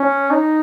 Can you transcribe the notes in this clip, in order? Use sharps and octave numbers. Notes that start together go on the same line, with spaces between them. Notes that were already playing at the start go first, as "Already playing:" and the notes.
Already playing: C#4
D#4